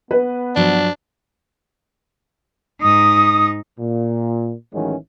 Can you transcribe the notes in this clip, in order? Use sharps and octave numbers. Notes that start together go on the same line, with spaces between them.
B3 B4
G2 F3 F#3 D4
G#2 D#4 D#6
A#2
A1 D#3 E3 F#3 G#3 C#4